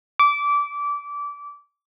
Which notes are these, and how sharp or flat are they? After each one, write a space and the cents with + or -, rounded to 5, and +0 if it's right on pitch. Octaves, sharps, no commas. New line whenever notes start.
D6 -20